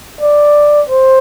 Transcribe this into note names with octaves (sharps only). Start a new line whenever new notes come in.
D5
C5